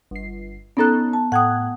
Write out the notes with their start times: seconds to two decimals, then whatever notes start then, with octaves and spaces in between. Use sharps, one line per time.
0.11 G1 C7
0.77 B3 C#4 D#4 A4 A#5 F#6
1.13 A5
1.32 A2 F#5 G5 D#6 F#6 G#6